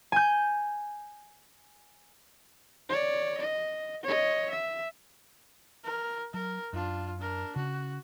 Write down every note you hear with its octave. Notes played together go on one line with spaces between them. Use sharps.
G#5 G6
C#5 D5
D#5
C#5 D#5
E5
A#4
F#3 A#4
F#2 D4 F4
D4 A#4
C#3 F#4